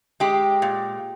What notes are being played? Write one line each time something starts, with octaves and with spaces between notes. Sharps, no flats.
G#3 G4
A#2